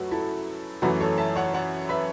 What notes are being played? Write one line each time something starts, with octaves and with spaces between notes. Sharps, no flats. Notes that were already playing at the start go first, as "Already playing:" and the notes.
Already playing: F#2 F#3 A3 F#4 B4
E4 A4
F#2 E3 A3 F#4 B4
A4 C#5
E5 A5
C#5 F#5
C#5 F#5
B4 E5